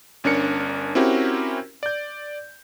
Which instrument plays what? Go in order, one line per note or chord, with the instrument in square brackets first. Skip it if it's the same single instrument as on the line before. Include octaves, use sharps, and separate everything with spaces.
[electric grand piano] G1 C#4 D4 A#4 C#7
C4 C#4 E4 F#4 G4 A#4
D5 G6